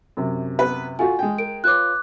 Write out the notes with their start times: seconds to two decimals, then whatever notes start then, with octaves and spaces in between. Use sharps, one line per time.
0.17 F#2 C3
0.59 B3 B4
0.99 F4 F#4 A4 G#5
1.19 G#3 G#4 G5
1.38 A#4 D7
1.64 F4 B4 C#5 D6 F#6